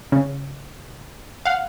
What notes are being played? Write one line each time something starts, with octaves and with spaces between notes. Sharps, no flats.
C#3
F5 F#5